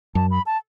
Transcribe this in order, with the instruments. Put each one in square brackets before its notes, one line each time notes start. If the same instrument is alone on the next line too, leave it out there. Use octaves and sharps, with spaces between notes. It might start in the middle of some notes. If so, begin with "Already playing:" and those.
[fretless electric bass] F#2 [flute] A5
[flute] B5
A5